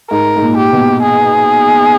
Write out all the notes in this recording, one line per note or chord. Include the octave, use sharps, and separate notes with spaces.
G#2 A#4
G#2
A#2
G4
B2
G#4